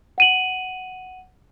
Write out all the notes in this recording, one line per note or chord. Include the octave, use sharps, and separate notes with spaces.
F#5 D#7 F#7